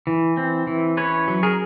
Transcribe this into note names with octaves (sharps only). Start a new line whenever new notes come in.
E3
C4
E3
C#4 B4 C#5
F#3
G#4 A#4